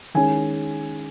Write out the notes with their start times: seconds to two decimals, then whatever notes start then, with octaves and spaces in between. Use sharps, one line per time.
0.14 D#3 G#3 C#4 G#5